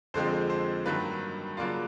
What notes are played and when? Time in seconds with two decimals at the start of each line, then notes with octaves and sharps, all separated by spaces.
0.14 F2 D3 F3 G#3 C4 C5
0.50 C5
0.86 G2 D#3 F#3 A#3 B4
1.57 C#3 F#3 A#3 D4 F4